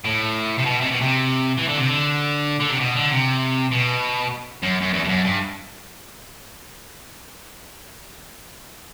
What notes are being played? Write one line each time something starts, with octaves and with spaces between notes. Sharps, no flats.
A2
C3
B2
C3
B2
C3
E3
D3
C3
D3
D3
C3
B2
D3
C3
B2
F#2
F#2
E2
G2
F#2
G2